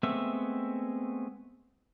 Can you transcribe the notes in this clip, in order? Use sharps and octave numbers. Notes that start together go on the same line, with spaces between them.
G#3 A3 B3 C4 E5